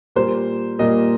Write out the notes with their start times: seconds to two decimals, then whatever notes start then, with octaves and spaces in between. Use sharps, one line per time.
0.16 A#2 G3 A#3 C5
0.79 A#2 G3 A#3 D#5